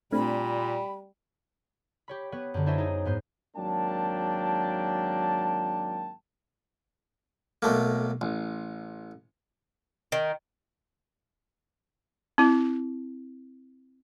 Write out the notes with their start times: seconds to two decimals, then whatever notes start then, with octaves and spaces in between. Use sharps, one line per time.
0.13 A#2 G3 A3 C4 D4 B5
2.08 G4 C#5 B5
2.32 B3 B4 C#5
2.54 F#2 D3
2.66 D4 E4 C5 C#5 D#5 E5
2.78 D#4 G#4
3.05 G#2 B3 C5
3.56 G#1 F#3 A#3 D4 G5 A5
7.62 B1 A3 A#3
8.21 A1
10.12 D#3
12.38 C4 E4